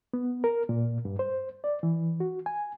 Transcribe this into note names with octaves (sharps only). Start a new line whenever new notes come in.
B3
A#4
A#2
G2
C5
D5
E3
F#4
G#5